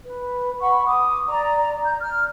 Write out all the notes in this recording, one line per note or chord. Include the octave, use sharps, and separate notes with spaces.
B4
F#5 B5 C#6
D6 D#6
D5 A#5
G6
F6